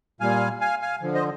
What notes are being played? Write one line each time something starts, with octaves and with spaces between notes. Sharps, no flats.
A#2 G3 F5 G#5
F5 G#5
F5 G#5
D3 F3
C5 D#5